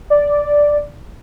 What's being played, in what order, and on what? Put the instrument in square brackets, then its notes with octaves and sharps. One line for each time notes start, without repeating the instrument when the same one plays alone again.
[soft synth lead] D5